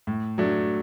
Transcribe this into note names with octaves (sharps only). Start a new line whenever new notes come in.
A2
F#3 A3 D4